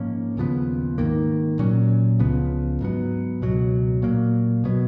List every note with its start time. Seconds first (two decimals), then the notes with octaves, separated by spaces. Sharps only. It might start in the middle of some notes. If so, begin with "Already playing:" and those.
Already playing: G#2 F3 A#3 C#4
0.37 D#2 C#3 F3 B3
0.98 G#2 D#3 A#3
1.59 A#2 F#3 C#4
2.19 C#2 C#3 F3 B3
2.81 G#2 F#3 B3
3.41 C#2 B2 F#3
4.02 A#2 F#3 A#3
4.64 B2 F#3 B3